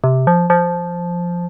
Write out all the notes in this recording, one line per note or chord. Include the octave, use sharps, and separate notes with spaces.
C3
F3
F3